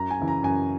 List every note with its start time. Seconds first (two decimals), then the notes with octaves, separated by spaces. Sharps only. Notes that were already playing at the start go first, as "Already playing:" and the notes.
Already playing: F#2 A#5
0.11 G#5
0.19 C#3 E3
0.28 A#5
0.43 F#2 G#5